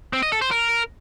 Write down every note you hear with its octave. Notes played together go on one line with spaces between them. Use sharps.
C4
D#5
A4
C5
A#4